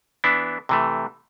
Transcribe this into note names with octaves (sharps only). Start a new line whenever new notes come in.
E3 B3 D4 E4
C3 E3 A3